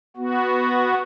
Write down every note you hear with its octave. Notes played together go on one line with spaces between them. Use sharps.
B3 F#4